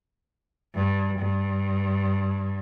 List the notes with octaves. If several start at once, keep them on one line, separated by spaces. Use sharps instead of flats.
G2
G2